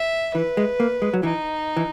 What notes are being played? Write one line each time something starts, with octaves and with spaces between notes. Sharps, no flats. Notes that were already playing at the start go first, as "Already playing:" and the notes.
Already playing: E5
E3 B4
G#3
A#3
G#3
F#3
E3 D#4
E3